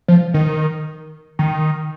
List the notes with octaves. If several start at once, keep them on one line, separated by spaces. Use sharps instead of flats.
F3
D#3
D#3